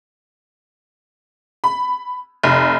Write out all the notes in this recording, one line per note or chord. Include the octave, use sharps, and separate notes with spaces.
B5
F1